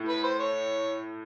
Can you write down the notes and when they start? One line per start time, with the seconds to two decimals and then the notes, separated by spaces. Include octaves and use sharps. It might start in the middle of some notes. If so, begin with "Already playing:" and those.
Already playing: A2
0.09 B4
0.23 C5
0.39 C#5